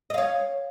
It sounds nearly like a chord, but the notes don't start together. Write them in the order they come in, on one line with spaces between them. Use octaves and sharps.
D#5 F5 C#5